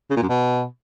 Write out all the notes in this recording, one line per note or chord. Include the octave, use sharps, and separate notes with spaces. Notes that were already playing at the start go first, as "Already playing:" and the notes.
C#3
A#2
F#2
B2